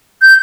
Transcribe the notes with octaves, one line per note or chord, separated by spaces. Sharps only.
G6